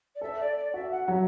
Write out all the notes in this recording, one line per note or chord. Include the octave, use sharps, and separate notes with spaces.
D5
A4 E5
D5
D5
F#4 E5
F#5
F#3 E5